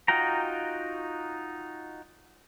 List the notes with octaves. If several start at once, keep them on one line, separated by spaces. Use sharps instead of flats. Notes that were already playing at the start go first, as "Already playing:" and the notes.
D#4 F4 F#4 G5 A#5